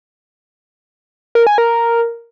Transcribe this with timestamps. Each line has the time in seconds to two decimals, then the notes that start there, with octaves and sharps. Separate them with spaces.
1.35 A#4
1.47 G#5
1.58 A#4